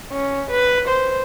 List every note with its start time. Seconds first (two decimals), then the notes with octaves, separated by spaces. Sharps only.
0.12 C#4
0.51 B4
0.88 C5